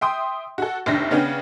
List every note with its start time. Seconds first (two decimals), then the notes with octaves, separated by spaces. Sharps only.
0.01 E5 G5 C6 D#6
0.58 F#4 A4
0.86 F1 D#2 D4 E5 A#6
1.11 C#3 B3 C#4 D4 G5